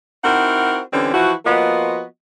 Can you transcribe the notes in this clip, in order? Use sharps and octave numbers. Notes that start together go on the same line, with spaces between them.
C4 D#4 E4 F#4 A#4 F#5
D3 E3 G3 C4 C#4
E3 F3 E4 F#4
F3 A#3 B3 F4 F#4 D#5